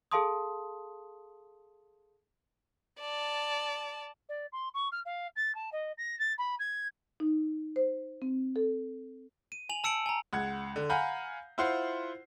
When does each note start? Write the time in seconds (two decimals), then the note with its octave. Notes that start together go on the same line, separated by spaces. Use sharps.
0.11 G#4 A4 F5 A5 C6 D#6
3.00 D5 A5
4.29 D5
4.52 C6
4.74 C#6
4.92 F6
5.05 F5
5.36 A6
5.55 A5
5.72 D#5
5.98 A#6
6.19 A6
6.38 B5
6.59 G#6
7.20 D#4
7.76 C5
8.22 C4
8.56 A4
9.52 D#7
9.69 G#5 F7 F#7
9.84 A5 E6 C#7 D7 F#7
10.06 G#5 A#5
10.33 C#2 F#5 G#6
10.76 D3
10.89 F5 F#5 G#5 A#5 B5 G6
11.58 E4 F4 C5 F#5 C6 C7